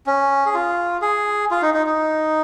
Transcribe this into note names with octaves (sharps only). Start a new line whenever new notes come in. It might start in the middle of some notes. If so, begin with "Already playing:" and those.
C#4
G#4
F4
G#4
F4
D#4
D#4
D#4